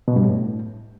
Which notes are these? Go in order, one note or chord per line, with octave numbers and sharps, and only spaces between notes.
B2
G2
A2